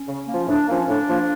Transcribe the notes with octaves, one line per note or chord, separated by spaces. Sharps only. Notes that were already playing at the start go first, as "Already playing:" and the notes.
Already playing: C#4
C#3
F3 A#3
A2 D4
F3 A#3 C#4
A2 D4
F3 A#3